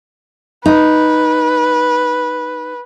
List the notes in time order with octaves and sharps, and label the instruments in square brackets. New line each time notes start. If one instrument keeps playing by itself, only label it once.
[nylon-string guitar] D#4 [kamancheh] B4